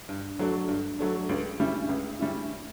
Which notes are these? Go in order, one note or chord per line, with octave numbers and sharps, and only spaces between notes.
G2
F#3 A3 D4
G2
F#3 A3 D4
C#2
C#3 G3 C#4 E4
C#2
C#3 G3 C#4 E4